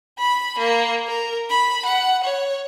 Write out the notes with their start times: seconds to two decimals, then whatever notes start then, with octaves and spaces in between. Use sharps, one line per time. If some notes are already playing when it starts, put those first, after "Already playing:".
0.18 B5
0.59 A#3
1.07 A#4
1.49 B5
1.85 F#5
2.24 C#5